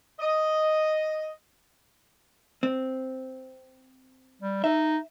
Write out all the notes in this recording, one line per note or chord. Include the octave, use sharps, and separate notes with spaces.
D#5
C4
G3
D#4 E5